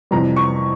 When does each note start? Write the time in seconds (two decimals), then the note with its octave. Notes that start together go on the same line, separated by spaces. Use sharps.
0.11 F2 C3 E3 G3 A#5
0.36 C#6